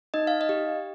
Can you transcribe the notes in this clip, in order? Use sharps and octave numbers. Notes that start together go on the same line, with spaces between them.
D#4 D#5
F5
D#5
G4